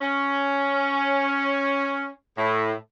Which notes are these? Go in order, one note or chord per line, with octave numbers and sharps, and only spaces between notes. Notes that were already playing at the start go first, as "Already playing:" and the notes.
C#4
A2